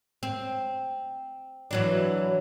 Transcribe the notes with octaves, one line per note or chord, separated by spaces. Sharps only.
C4
E3 F#3 D4